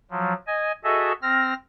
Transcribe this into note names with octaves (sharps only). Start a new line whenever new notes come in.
F3 F#3
D#5 G#5
F#4 G#4 A4 D#5 E5
C4 F6 A#6